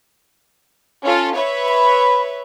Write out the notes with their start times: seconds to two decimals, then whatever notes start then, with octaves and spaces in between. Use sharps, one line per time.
1.04 C#4 F4 A4
1.35 B4 C#5 E5
1.68 B5